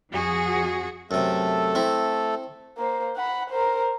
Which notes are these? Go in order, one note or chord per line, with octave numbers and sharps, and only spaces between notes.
F2 F3 F#4 G#4
F#2 C3 A3 A4
C4 E4
A#3 C5
F#5 B5
A#4 C5